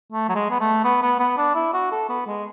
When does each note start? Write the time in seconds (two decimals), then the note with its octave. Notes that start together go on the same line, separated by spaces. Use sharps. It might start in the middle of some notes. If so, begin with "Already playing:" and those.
0.12 A3
0.29 F#3
0.35 G#3
0.51 B3
0.60 A3
0.84 B3
1.02 B3
1.20 B3
1.37 D4
1.55 E4
1.74 F#4
1.92 A4
2.09 B3
2.26 G#3